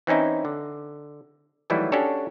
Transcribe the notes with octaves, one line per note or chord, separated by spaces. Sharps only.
E3 C4 C#4 D#4 E4
D3
D#3 E3 F#3 G3 A3 E4
C#4 D4 F#4 G4 A4 C#5